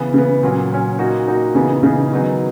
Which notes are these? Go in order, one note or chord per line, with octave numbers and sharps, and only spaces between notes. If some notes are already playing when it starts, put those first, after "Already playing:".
Already playing: C#3 E3 B3
C#3 E3 B3
A#2 F#3 C#4
A#2 F#3 C#4
A#2 A#3 D#4 F#4
A#2 A#3 D#4 F#4
C#3 E3 B3 D#4 G#4
C#3 E3 B3 D#4 G#4
D#3 F#3 B3 D#4 G#4